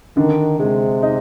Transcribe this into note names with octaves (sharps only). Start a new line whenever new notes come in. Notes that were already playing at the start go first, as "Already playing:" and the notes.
D3 D#3
C3 G#3
D#4